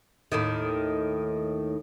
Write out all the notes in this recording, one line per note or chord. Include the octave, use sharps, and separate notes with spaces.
D#2 A2 D#3